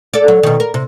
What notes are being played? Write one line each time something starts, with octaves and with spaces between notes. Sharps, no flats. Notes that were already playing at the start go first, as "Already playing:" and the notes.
A4 D5
F#3
B2 D#3
A#4
C3